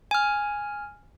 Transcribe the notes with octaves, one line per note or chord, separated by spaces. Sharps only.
G#5 F6